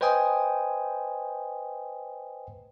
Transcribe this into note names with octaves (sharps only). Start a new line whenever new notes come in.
B4 C5 D#5 G5 G#5 D#6